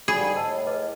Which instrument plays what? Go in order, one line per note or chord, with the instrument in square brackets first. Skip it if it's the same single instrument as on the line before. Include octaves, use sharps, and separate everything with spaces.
[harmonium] G#2 D3 G3 [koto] G#4 [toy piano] B5
[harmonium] A2 [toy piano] D#5 A5 E6
[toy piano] G#4 B4 D#5